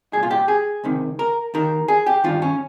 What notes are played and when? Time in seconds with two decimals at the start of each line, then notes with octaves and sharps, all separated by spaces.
0.13 C2 A#2 G#4
0.23 F4
0.31 G4
0.48 G#4
0.84 C#2 C3 D#3
1.19 A#4
1.54 D#2 D#3 A#4
1.88 G#4
2.06 G4
2.24 G2 D#3 F4
2.42 C#4